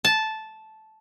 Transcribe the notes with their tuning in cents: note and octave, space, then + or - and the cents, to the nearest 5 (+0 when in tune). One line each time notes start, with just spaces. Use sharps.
A5 -10